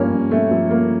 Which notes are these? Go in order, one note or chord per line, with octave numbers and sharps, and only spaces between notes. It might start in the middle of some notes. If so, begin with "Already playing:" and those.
Already playing: G2 F3 A#3 C#4
G2
A3
F3 A3
A#3